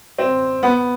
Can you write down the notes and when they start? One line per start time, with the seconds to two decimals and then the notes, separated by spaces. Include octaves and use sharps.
0.19 C4
0.63 B3